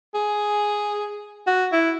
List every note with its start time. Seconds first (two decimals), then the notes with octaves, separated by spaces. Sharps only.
0.14 G#4
1.47 F#4
1.72 E4